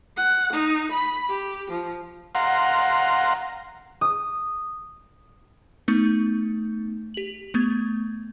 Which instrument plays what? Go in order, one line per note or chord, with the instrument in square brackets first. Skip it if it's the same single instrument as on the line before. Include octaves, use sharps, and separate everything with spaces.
[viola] F#5
D#4
B5
G4
F3
[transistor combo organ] F5 F#5 A#5 C6
[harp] D#6
[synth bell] A3 B3 D#4
G4 F#7
A3 B3 G#6